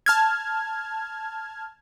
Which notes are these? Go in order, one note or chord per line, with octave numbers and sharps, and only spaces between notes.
A5 F6 G#6